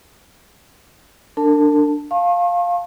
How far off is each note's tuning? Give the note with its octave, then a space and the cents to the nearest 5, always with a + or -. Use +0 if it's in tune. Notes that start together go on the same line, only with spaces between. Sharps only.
D4 +5 A#4 -40 A5 +5
F5 +5 A5 +0 C#6 -45